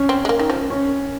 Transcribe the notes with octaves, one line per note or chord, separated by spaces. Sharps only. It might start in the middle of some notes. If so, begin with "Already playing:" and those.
Already playing: C#4
C4
G#3
A#3
D#3
F3
C#4